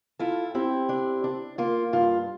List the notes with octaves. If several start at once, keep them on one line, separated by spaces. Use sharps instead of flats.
E4 F4 A4
C4 E4 G4
D4
D4
A#3 F4
G2 F4